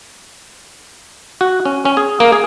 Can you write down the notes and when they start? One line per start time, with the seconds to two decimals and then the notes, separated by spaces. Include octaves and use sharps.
1.41 F#4
1.65 C#4
1.85 C#4
1.97 G#4
2.20 A#3
2.32 G#4